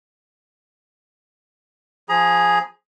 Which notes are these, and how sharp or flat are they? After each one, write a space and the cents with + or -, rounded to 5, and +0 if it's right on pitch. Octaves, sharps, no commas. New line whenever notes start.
F3 +0 G#4 +0 A#5 +35